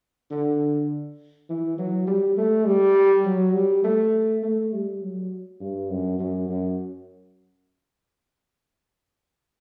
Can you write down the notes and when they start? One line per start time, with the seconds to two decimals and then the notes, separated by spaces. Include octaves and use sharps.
0.31 D3
1.49 E3
1.78 F#3
2.07 G3
2.37 A3
2.66 G3
3.25 F#3
3.54 G3
3.84 A3
4.43 A3
4.73 G3
5.02 F#3
5.61 G2
5.90 F#2
6.19 F#2
6.49 F#2